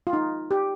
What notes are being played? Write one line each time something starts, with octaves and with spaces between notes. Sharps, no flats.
F4
D#4
G4